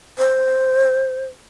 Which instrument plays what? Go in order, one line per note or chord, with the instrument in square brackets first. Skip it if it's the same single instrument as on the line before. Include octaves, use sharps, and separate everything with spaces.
[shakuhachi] C5